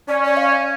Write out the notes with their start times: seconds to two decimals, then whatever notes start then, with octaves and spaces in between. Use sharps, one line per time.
0.08 C#4 D5
0.24 D5
0.37 F5